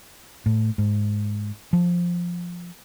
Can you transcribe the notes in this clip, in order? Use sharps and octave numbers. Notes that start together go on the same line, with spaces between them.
A2
G#2
F3